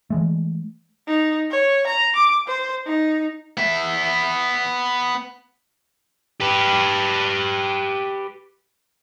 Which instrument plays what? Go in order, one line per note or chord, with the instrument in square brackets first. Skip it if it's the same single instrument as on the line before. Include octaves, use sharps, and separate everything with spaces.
[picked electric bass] E3 G#3 A3
[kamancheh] D#4
C#5
A#5
D6
C5
D#4
[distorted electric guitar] B3 E5
G4 B4